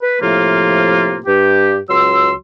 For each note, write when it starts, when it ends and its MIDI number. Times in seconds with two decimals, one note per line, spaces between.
0.02 0.21 71
0.22 1.19 45
0.22 1.19 48
0.22 1.19 53
0.22 1.19 58
0.22 1.19 65
1.27 1.77 43
1.27 1.77 67
1.90 2.31 37
1.90 2.31 54
1.90 2.31 84
1.90 2.31 88